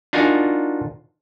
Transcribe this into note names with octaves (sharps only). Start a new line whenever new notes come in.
D4 D#4 F4 F#4 A#4 G#5